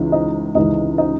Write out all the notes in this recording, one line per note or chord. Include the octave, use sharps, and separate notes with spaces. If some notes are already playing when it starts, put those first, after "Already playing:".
Already playing: C#2 C#3 E3 D#4
D#4 D#5
C#2 C#3 E3 D#4 D#5
D#4 D#5